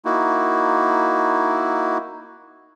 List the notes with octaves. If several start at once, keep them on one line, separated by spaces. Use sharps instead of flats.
A#3 D#4 E4 F#4